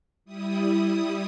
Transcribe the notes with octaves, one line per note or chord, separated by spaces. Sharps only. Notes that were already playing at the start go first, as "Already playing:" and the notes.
G3 E4 D#6